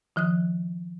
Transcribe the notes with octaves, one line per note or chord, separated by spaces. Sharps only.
D#3 F3 D#6 F#6